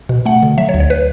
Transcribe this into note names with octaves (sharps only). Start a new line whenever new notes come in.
B2
A3 F#5
D3
F#3 E5
C#5
D2
C#5
B4